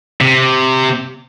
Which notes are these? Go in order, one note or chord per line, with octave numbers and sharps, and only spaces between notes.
C3